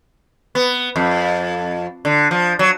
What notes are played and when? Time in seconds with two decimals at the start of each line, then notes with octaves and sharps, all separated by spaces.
0.55 B3
0.96 F2
2.05 D3
2.31 F3
2.59 F#3